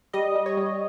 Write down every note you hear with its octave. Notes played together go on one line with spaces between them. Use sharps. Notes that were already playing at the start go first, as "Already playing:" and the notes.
G3 D#5
G3
C#5
G3